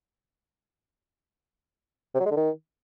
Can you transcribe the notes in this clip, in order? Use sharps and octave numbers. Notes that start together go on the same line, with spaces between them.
C3
F#3
G#3
D3
D#3